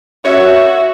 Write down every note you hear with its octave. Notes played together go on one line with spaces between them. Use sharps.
F#4 C#5 E5